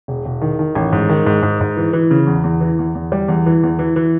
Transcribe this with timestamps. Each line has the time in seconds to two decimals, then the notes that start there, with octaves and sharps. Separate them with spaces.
0.08 E1
0.25 E1
0.41 D#3
0.59 D#3
0.75 A1
0.92 G#2
1.09 D#3
1.26 G#2
1.42 G#2
1.61 G#2
1.77 E3
1.93 E3
2.11 C#3
2.27 E2
2.44 E2
2.61 E3
2.79 E2
2.95 E2
3.12 G3
3.28 E2
3.46 E3
3.63 E2
3.79 E3
3.96 E3